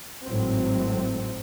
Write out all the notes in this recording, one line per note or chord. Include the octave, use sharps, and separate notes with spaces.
G#1 A2 F#3 C4